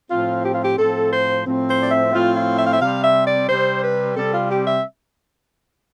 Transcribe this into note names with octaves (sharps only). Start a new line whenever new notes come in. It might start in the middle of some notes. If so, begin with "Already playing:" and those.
A2 F3 C4 F4
G4
F4
G4
A2 F3 C4 A4
C5
A2 F3 C4
C5
D5
E5
A2 F3 C4 F4
F4
E5
F5
E5
C3 G3 C4 F5
E5
D5
C3 G3 C4 C5
B4
C3 G3 C4 A4
F4
G4
E5